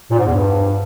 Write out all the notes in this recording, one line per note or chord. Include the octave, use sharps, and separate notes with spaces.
A#2
G#2
E2
G2